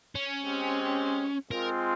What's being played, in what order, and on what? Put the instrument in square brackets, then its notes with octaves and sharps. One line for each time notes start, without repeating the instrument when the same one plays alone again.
[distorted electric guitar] C#4
[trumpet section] G#3 C4 G4 C5
[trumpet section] G#3 C4 F4 [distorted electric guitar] A#4